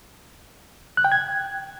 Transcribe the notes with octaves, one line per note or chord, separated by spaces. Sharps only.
F#6
G5
G#6